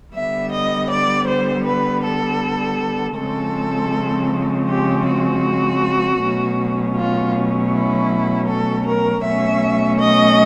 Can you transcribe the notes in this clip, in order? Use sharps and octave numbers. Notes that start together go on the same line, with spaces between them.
D3 G3 B3 E5
D#5
D5
C5
B4
A4
C#3 F3 G#3 C4 A4
G4
F#4
B2 F#3 A3 C#4
F4
E4
A4
A#4
B2 F#3 A3 C#4 E5
D#5